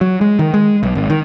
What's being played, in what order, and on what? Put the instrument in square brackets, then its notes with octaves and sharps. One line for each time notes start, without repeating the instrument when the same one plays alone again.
[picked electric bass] F#3
G#3
D#3
G#3
B1
G#1
D#3